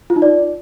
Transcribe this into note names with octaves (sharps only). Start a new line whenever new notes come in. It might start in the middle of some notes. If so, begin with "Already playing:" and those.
F4
D#4
D5